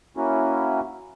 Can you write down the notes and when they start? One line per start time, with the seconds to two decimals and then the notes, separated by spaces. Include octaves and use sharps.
0.17 A#3 C#4 E4 F#4